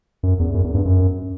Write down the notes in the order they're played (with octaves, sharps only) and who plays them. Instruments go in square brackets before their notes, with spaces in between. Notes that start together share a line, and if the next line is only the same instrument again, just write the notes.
[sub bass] F#2
E2
F#2
E2
G2
F#2